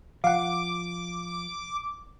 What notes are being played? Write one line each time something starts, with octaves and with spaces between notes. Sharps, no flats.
F3 F5 F#5 D6